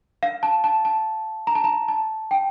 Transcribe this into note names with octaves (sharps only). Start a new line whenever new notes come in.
F5
A5
A5
A5
A#5
A5
A#5
A5
G5